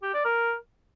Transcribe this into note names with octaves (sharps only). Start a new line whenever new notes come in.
G4
D5
A#4